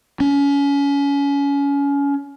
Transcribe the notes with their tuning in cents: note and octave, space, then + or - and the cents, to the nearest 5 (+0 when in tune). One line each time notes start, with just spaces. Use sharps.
C#4 +30